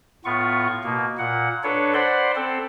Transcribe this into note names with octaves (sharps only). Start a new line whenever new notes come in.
A2 B3 F4 C#6
B2 A#3
A#2 F#5
D4 A4 B4 C#5
C5 D5 F#5 B5 C6
C4 A4